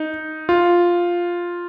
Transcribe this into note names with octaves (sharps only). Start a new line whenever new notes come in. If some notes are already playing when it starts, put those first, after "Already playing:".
Already playing: D#4
F4